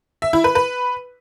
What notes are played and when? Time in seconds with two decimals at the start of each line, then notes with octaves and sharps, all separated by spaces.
0.22 E5
0.33 E4
0.44 B4
0.55 B4